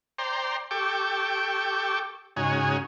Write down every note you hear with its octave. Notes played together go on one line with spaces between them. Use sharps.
C5 D5 G5 A#5 C6
G4 A4 G5 C#6 D6
G#2 C#3 D#4 F#4 C#5 G#5